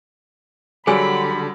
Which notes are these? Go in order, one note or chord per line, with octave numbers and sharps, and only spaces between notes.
D3 F#3 G3 G#4 G#5 B5 E6